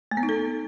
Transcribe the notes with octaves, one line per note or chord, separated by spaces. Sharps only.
A3
B3
D#4
A4